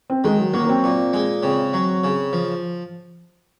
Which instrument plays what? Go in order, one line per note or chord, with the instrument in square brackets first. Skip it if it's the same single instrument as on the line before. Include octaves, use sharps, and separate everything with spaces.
[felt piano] C4
[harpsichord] D#3 [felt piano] G#3
[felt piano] F#3
[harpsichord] F#3 [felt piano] A#3
[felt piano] A#3
C4
[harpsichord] A#2
G#3
[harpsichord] C#3 [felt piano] C4
[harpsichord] F#3
C#3
F3